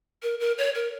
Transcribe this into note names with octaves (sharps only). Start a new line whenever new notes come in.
A#4
A#4
C#5
A#4